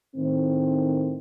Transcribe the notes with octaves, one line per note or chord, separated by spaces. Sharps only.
A2 D#3 C4